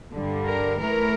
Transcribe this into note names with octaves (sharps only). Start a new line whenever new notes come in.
G2 D3 G3
A#4
A2 E3 A3 A#4